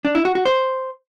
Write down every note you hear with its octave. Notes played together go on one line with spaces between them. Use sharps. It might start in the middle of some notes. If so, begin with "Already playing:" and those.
D4
E4
F#4
F#4
C5